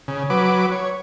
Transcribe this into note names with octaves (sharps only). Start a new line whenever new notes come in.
C#3
F#3 B4 D6
C#5